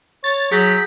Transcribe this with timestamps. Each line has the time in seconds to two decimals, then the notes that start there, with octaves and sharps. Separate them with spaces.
0.24 C#5 A6
0.51 F#3 G#4 G6 A#6 B6